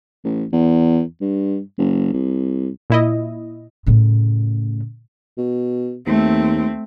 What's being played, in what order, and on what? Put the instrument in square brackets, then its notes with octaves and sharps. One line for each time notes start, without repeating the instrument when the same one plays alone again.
[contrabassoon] A1
E2
G2
F#1
C2
[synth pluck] A#2 E4 D#5
[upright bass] A2 C#3
[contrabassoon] B2
[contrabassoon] D#2 [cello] A3 C4